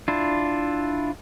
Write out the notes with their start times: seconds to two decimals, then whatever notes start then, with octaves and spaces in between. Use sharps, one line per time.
0.08 D4 E4 F4